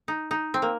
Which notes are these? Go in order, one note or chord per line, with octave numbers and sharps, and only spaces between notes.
D#4
D#4
C4
A#3